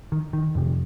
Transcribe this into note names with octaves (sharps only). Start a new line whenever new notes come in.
D#3
D#3
F2 C3